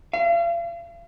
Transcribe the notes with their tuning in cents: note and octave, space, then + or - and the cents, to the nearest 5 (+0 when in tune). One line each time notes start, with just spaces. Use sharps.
F5 -40